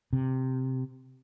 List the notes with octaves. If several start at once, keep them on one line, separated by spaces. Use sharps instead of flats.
C3